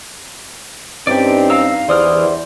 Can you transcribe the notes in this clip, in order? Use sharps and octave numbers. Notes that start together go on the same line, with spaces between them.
G2 C4 C#4 D#4 G4 D5
F5 A#5 E6
E2 G2 E3 C5 D5 D#6 F6